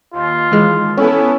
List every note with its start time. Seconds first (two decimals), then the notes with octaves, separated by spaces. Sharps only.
0.13 D#2 F4
0.52 E3 G#3
0.97 B3 C#4 E4 A4 G#5